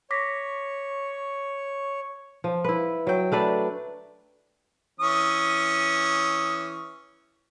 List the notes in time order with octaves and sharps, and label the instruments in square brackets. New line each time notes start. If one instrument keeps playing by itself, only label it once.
[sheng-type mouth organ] C#5 [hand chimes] D6 A#6 B6
[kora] F3
E4 B4
F#3 G5
A3 D4 B4 D5
[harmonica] E3 C#4 D#6